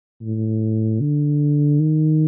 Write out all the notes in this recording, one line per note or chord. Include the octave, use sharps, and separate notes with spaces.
A2
D3
D#3